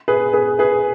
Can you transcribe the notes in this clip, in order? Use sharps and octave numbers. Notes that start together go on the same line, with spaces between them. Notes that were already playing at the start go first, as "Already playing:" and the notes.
G#4 B4
G#4 B4
G#4 B4